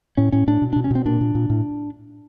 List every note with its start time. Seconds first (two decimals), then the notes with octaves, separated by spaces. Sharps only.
0.17 A2 C#4
0.32 A2 C#4
0.47 A2 D4
0.62 B2
0.73 B2 D4
0.84 C#4
0.91 B2 C4
1.06 A#2 D4
1.21 A#2
1.35 A#2
1.50 A2